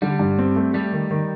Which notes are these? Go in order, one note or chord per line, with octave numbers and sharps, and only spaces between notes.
D3 G3
G2
C4
A3
G3 A3
D#3
D#3